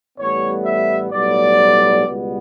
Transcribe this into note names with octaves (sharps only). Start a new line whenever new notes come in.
A1 A2 G3 B3 C#5
E5
B1 A2 G3 B3 D5
C#2 B2 G3 B3